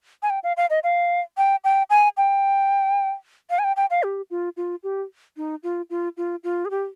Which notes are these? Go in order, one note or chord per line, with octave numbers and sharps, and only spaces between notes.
G#5
G5
F5
F5
D#5
F5
G5
G5
G#5
G5
F5
G#5
G5
G5
F5
G4
F4
F4
G4
D#4
F4
F4
F4
F4
G#4
G4